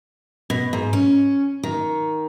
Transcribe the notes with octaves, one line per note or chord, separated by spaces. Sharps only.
B2
G#2
C#4
D#3